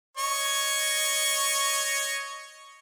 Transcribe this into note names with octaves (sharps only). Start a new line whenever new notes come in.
C#5 D#5 C#6